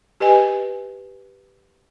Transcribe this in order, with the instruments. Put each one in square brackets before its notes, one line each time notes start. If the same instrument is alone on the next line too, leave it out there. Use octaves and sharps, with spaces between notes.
[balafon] G4 B4 D#5 G#5